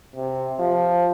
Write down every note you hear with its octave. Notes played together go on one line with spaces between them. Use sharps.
C3
F3